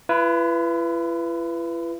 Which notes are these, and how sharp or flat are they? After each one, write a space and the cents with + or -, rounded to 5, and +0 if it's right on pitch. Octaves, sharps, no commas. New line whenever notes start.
E4 +45 B4 +0